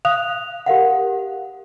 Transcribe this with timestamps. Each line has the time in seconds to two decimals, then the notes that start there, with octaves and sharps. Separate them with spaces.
0.05 F5 D#6 F#6 F7
0.66 G4 A#4 F5 F#5